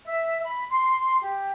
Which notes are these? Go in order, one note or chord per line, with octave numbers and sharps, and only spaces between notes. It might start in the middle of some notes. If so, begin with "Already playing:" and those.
E5
B5
C6
G4